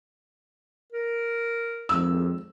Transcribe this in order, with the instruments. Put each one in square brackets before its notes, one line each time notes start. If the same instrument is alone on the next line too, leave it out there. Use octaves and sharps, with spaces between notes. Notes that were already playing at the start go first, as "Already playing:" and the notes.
[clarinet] A#4
[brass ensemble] G#1 F2 [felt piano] E6